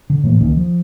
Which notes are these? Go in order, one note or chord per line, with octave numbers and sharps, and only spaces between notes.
D3
A2 E3 A#3
C#2 D#3 A#3 C#4
F3